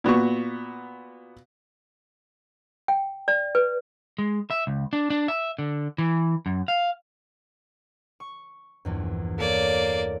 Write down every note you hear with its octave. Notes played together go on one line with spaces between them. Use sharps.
A#2 B3 F#4 C#6
G5
D5
B4
G#3
E5
C#2
D4
D4
E5
D3
E3
F#2
F5
C#6
A#1 E2 G2
A#3 A4 C#5 D5